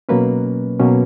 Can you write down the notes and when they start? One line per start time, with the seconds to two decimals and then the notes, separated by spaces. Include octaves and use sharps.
0.09 B2 F#3 A#3 C#4 B4
0.80 B2 F#3 A#3 C#4